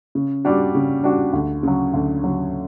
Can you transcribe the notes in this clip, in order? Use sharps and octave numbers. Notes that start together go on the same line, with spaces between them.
C#3
G3 D4 F#4
C#3
G3 D4 F#4
D2
C#3 F#3
D2
C#3 F#3